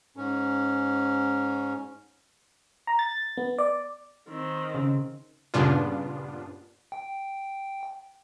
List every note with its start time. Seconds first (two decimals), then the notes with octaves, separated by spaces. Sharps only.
0.16 G#2 C#4
2.87 A#5
2.99 A6
3.37 B3
3.58 D5
4.29 D#3 C4
4.74 C#3
5.54 G2 A#2 C#3 B3 D4 F4
6.92 G5